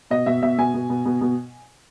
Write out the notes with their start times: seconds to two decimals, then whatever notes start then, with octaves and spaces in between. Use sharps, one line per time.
0.10 B2 D#5
0.26 B2 E5
0.42 B2 E5
0.58 B2 G#5
0.74 B2
0.90 B2
1.05 B2
1.21 B2